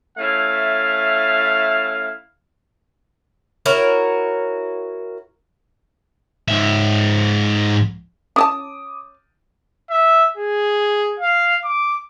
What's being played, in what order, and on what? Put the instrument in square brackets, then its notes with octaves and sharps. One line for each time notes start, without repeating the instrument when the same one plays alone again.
[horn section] A3 C#4 E4 F5
[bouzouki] E4 F#4 A#4 C#5
[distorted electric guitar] G#2 E5
[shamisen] C#4 D5 A5 [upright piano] D6 D#6
[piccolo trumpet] E5
G#4
F5
D6